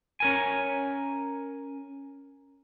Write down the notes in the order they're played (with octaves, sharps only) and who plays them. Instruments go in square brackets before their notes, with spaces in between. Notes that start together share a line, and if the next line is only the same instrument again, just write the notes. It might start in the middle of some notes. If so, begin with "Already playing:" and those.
[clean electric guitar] C#4 A#4 G#5